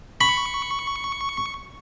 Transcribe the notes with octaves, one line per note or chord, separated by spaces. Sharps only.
B5 C#6